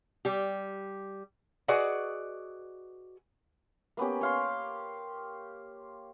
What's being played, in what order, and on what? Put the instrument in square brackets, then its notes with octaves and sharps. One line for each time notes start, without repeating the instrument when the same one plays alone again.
[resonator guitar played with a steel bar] G3 G4
F#4 G#4 B4 D5 D#5 F#5
[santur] A#3 B3 C#4 G4
C#5 F5 C6